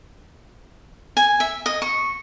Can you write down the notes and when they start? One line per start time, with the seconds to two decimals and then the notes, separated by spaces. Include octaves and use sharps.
1.17 G#5
1.40 E5
1.66 D#5
1.82 C#6